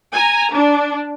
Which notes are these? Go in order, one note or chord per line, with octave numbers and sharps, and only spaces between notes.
G#5 A#5
D4